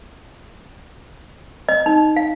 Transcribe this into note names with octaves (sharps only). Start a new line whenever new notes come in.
D#5
D#4
F5